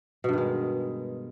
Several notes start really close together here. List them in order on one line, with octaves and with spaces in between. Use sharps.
B2 G2 D#3 G#3